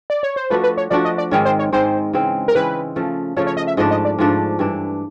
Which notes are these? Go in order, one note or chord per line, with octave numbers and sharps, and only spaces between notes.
D5
C#5
C5
F3 A3 D4 F#4 B4
B4
C#5
F3 A3 D4 F#4 D5
D#5
D5
G#2 D#3 G#3 C4 C#5
C5
C#5
G#2 D#3 G#3 C4 C5
C#3 E3 G#3 C4
A#4
C#3 E3 G#3 C4 B4
C#3 F3 A3
C#3 F3 A3 C#5
C#5
D#5
E5
G#2 F3 A3 D4 D#5
D#5
D5
G#2 F3 A3 D4
G2 E3 A3 D4